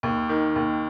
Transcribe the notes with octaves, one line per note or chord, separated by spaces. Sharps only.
D#2
D#3
D#2